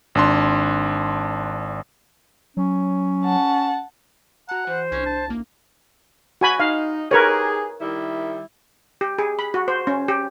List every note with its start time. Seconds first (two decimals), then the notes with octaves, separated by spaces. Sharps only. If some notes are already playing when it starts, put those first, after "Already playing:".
0.15 G#1 D4 C6
2.57 F#3 C#4
3.24 F#5 A5
4.49 F#4 F#5 A5 A#5
4.67 E3 C5
4.92 C2 C#4 D4
5.06 A5
5.28 A1 A#3
6.41 F#4 G#5 B5
6.60 D#4 F5
7.11 D#4 G4 G#4 A#4 B4 C#5
7.81 D#3 G3 E4
9.01 G4
9.19 G#4
9.39 B5
9.54 F#4
9.68 C5
9.87 C#4
10.08 G4